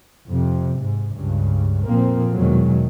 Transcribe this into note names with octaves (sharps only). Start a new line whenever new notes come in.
F2 C3
G#2
C#2 G2 C#3
F2 A#2 F3 A#3 C4
E2 B2 D#3 F#3 G#3